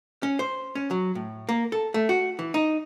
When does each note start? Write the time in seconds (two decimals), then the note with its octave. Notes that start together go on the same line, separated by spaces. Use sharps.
0.23 C#4
0.39 C5
0.75 C#4
0.91 F#3
1.15 A2
1.49 A#3
1.72 A4
1.94 A3
2.09 F#4
2.39 E3
2.54 D#4